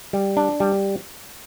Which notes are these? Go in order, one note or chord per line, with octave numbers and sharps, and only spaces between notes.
G3
D4
G3